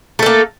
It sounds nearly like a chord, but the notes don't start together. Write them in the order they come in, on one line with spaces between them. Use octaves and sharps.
A3 A4 A#3